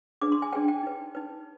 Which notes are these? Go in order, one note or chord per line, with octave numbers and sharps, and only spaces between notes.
D4 G#4 B4 D6
C6
G#5
D4 G#4 B4 G5
G5
D#4 B4
D#4 B4